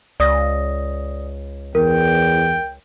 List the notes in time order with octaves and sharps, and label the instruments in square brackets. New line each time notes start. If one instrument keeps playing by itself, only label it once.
[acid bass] C#2 [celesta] D5 D#6 A#6
[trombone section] E2 [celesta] A#4 [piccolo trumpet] G5